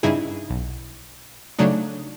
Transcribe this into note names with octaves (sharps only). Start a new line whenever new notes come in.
G2 C#3 D#4 E4 G#4
B1
C#3 F#3 A3 D4 D#4